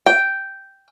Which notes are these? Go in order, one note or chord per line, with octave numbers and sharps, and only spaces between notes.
G5